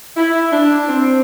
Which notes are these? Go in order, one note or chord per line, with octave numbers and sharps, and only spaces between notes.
E4
D4
C4